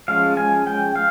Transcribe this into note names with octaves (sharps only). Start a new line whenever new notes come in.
F3 G#3 C#4 F5
G#5
G5
F5